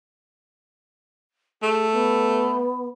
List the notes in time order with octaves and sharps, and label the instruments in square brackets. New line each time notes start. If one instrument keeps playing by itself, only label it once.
[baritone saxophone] A3 [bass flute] G#4
[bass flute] B3